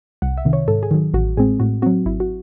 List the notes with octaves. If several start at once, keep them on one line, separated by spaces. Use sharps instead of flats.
C2 F#5
E5
C3 D#3
C#5
G#2 A4
G#4
D#3 F#3
A1 F#4
A2 G#3 C4 G#4
A2 F#4
F#3 C4 F#4
G#1 E4
F#4